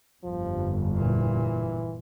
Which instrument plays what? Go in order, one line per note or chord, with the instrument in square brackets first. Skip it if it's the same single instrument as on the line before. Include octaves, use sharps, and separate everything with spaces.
[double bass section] G1 F2 [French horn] F3
[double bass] A#2 [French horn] E3